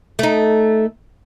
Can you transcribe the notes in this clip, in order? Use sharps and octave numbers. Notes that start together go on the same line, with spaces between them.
A3 D#4